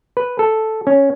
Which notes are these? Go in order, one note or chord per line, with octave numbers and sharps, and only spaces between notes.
B4
A4
C#4